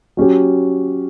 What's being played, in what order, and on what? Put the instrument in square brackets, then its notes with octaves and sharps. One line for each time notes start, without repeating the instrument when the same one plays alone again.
[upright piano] F#3 C#4 G4